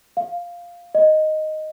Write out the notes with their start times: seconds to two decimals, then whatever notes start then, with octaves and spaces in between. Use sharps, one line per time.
0.17 F5
0.95 D#5